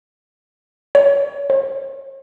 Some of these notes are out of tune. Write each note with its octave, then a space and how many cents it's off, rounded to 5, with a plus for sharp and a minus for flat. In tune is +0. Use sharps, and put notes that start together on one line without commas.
C#5 +30
C#5 -40